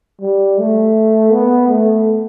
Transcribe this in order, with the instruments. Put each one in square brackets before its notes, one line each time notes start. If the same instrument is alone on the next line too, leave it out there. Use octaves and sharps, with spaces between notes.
[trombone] G3
A3
B3
A3